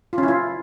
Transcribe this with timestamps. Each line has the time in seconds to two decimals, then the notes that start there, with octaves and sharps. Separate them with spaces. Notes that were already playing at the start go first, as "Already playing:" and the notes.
0.13 F4
0.18 C#4
0.23 E4
0.28 F4